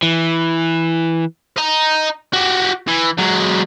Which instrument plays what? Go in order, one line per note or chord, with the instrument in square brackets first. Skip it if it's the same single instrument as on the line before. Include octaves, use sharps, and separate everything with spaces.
[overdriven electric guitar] E3
[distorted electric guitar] D#5 A#5
F#4 G4
E3
F#3 G#3